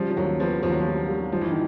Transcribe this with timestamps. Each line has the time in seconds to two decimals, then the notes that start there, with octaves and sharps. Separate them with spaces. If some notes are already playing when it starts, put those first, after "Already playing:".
Already playing: C#3 F3 G3
0.10 F3
0.17 D#2 F#3
0.40 F3 B3
0.62 D#2 F3
0.72 F#3
0.80 F3
0.86 G3
1.09 G3
1.32 G1 F3
1.41 E3
1.51 D#3